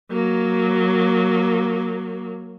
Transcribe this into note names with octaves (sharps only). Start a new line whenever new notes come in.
F#3 A#3